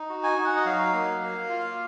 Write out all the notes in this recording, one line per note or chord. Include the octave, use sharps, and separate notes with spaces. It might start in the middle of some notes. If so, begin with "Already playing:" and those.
Already playing: D#4
F#4
G#5
D#4
F#5
D#5
F#3 F5
A#3
A#3
F4